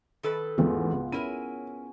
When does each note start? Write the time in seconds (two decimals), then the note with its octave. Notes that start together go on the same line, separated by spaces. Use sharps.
0.23 D#3 A4 B4
0.58 A1 E2 G#2 B3 F4 G#4
0.92 C#2
1.12 C#4 E4 A#4 D#7